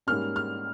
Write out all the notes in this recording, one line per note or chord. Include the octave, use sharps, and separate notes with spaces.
G#2 G3 A#3 C#4 F6
F6